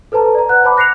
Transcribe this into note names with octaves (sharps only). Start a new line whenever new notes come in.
A4 B4 C5 A5 A#5
D5 A#5
B4 F#5 F#6
C5 A5 B5 D6
F#6 A#6 C7 C#7 F7